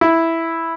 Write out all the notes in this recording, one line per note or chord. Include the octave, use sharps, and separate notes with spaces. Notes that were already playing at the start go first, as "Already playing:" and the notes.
E4